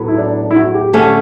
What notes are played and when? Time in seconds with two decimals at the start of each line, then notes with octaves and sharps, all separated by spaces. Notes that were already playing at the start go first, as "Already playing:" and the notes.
Already playing: A2 F#3 B3
0.08 E4
0.18 D4
0.37 D4
0.51 E4
0.56 F#4
0.74 G4
0.93 D3 A3 C#4